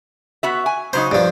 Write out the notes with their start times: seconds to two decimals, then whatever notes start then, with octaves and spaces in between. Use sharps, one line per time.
0.43 B3 F#4 E5
0.66 G#5
0.93 C#3 F#3 D#4 C5
1.11 G2 F3